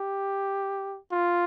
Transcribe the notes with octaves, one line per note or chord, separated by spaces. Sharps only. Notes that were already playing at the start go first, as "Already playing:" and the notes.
Already playing: G4
F4